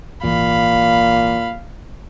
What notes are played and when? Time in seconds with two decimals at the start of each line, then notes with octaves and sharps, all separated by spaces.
0.24 G#1 A#2 E3 F5 B5